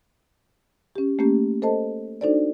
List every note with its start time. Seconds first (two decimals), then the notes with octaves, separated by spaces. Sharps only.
0.96 C#4 G4
1.19 A3 A#3 C#4 G4
1.62 A4 C5 D#5 A5
2.21 D4 D#4 F#4 A4 C5 D5